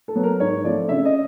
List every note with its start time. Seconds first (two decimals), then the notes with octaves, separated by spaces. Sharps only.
0.08 A4
0.15 F#3 B3
0.24 A#4
0.40 G#2 C#5
0.64 F3 A3 C4 D5
0.89 C#3 E5
1.05 D#5